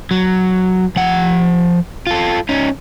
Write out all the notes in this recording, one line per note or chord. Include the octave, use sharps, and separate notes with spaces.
F#3
F3 F#5
F4 A4
C#4 D#4